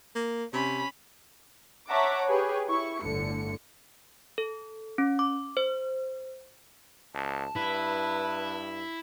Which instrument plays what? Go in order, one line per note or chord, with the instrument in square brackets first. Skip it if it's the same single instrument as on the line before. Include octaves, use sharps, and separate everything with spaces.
[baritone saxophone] A#3
[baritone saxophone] C3 [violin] C#4 B5
[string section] C#5 E5 F#5 A5 A#5 D6
G4 G#4 B4 C#5
E4 C#6
G1 A2 D3 C#7
[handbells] A4
C#4
D6
C5
[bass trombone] C#2 [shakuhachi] A5
[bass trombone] G2 [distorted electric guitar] E4 [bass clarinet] B4